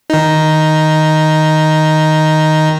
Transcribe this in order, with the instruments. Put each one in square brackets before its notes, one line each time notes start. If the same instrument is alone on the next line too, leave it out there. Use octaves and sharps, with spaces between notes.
[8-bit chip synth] D#3 D#4